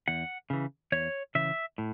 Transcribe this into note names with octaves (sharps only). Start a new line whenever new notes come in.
E2 F#5
C#3 E3
E2 C#5
C#3 E3 E5
A2